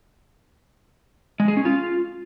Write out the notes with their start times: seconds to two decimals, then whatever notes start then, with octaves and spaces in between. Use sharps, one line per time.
1.40 G#3
1.48 G#4
1.57 C#4
1.65 F4